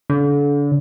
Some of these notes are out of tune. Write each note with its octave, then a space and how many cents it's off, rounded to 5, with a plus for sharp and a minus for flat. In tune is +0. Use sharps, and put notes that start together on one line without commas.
D3 -35